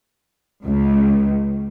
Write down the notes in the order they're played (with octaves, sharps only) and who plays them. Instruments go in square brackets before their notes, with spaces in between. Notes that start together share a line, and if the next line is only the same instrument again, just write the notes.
[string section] C#2